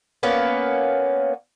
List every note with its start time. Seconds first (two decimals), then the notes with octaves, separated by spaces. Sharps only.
0.23 A#3 B3 C#4